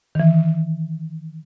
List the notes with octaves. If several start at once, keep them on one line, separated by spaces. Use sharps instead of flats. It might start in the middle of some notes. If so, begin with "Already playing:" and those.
D#3 E3